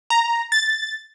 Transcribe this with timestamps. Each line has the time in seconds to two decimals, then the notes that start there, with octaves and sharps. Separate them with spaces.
0.10 A#5
0.52 A6